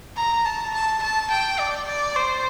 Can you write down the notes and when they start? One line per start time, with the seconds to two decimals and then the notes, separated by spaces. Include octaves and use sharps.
0.17 A#5
0.45 A5
0.74 A5
1.03 A5
1.31 G5
1.60 D5
1.88 D5
2.16 C5